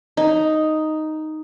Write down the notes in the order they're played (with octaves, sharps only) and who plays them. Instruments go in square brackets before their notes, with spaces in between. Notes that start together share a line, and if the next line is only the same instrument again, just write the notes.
[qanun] D#4